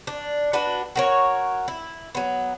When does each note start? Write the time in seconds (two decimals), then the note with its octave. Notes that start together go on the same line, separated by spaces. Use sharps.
0.07 D4
0.53 D4 F#4 B4
0.95 F#4 A#4 C#5
1.68 E4
2.15 F#3 B3